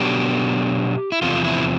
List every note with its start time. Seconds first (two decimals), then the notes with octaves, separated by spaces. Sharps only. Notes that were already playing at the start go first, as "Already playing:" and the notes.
Already playing: B2 F#3 B3 D4 G4
1.12 E4
1.22 E2 C3 F3 F4
1.44 E4